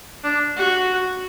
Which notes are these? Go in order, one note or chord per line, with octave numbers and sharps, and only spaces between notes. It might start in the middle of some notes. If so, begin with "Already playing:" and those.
D4
F#4